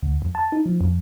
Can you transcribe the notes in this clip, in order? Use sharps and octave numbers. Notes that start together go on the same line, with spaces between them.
D2
F2
A5
D#4
F3
F2